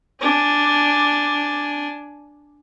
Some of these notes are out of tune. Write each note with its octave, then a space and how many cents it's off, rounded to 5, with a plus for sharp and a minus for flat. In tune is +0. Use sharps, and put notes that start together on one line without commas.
D4 +0 G#5 +10